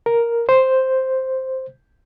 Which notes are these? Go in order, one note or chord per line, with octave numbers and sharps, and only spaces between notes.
A#4
C5